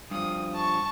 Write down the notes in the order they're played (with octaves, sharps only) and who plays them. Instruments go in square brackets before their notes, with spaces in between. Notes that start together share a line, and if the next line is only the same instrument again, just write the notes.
[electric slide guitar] G2 F3 [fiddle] D#6
[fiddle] A5 C#6